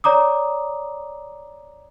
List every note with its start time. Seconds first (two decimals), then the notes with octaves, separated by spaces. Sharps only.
0.04 C#5 D5 A#5 D6 D#6